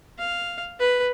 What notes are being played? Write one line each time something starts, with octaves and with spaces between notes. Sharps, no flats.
F5
B4